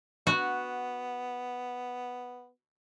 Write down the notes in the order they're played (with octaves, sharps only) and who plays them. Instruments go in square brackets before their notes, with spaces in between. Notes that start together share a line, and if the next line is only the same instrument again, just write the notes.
[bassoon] B3 [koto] F#4